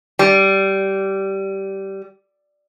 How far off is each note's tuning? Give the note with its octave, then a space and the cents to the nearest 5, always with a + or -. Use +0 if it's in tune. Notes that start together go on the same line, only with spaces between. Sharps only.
G3 -15